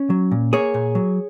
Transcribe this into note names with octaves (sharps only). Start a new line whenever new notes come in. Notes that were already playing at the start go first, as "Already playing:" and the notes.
Already playing: C#4
F#3
A#2
A#3 G#4 C#5
A#2
F#3